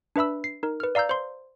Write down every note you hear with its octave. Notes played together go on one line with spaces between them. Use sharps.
D4 B4 E5 B5 E6
C7
D#4 A#4
B4 F6
D5 F5 A#5 E6 G6
C5 C6